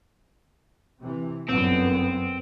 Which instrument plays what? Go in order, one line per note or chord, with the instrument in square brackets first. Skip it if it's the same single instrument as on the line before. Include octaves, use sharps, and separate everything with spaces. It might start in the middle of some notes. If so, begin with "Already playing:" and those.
[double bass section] C3 E3
[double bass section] G1 F#2 B3 [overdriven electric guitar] C4